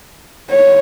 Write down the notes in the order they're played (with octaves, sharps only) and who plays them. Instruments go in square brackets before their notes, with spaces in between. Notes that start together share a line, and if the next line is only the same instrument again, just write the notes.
[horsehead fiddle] C#5